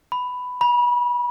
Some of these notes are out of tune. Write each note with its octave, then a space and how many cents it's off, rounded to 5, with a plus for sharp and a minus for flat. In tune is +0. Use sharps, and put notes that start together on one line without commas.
B5 +10
B5 -30